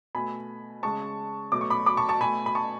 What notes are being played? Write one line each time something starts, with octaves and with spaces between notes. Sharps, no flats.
B2 A3 G#5 B5
C#3 G#3 A5 C#6
B2 F#3 A3 D6
C#6
B5 D6
B5 D6
A5 C#6
A5 C#6
B2 A3 G#5 B5
B5
A5 C#6